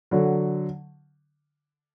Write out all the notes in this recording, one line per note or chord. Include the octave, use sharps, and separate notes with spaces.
D3 F#3